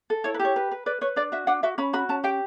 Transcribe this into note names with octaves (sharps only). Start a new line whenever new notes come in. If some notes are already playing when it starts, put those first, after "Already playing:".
A4
E4 C#5
B4
G4
C#5
B4
B4
B4 D5
B4 C#5
D4 D5
F#4 E5
D4 F#5
F#4 E5
C#4 B5
F#4 B5
C#4 A5
G4 G5